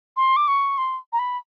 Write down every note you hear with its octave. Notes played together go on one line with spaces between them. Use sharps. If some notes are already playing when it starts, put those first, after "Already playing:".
C6
D6
C#6
C6
A#5
B5